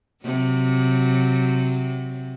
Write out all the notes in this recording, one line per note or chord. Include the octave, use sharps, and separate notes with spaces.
C3 F#3